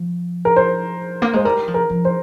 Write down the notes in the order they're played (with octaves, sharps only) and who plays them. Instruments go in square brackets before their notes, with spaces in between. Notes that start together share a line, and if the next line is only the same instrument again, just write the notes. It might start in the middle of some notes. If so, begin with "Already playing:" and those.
Already playing: [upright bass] F3
[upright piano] A#4
C5
[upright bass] A#3
[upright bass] G#3 [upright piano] C5
[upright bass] G3 [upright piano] A#4
[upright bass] F3
[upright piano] A#4
[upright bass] F3
[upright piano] C5